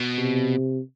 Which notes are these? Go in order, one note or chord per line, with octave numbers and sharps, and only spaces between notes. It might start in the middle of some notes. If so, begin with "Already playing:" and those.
Already playing: B2
C3